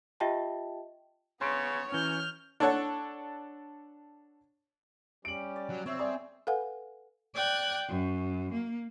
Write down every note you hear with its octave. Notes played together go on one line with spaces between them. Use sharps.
F4 G4 D#5 E5 G5 A5
C#3 B3 C#5 C6 D7
E3 F#3 C#4 F6 G6
D4 A4 C#5 F#5 A5
G3 C#4 G4 D7 F#7
D5
F#3
E2 C3 F3 C4 C#5 E5
G3 G#4 D5
A4 B4 F5 F#5 G#5
D5 G5 F#6 G#6
F#2
A#3